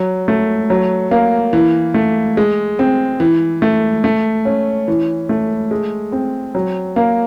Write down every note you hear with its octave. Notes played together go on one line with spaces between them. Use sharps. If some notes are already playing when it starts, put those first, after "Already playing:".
Already playing: F#3
A3
F#3
A#3
E3
A3
G#3
C4
E3
A3
A3
C#4
E3
A3
G#3
C4
F#3
A#3